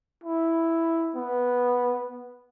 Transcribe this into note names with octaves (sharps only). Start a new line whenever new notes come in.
E4
B3